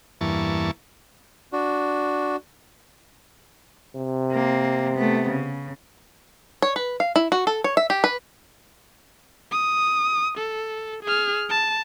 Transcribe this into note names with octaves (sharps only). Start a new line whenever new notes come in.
E2 G2 E3 A#3 A5 C#6
D4 F#4
C3
A#3 C4
A3 B3
C#3
C#5
B4
F5
E4
F#4
A4
C#5
E5
G4
B4
D#6
A4
G#4 F6
A5